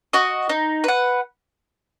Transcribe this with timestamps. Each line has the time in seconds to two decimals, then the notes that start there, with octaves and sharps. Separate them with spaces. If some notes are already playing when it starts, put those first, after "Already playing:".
0.13 F#4 D#5
0.49 D#4
0.84 B4 F#5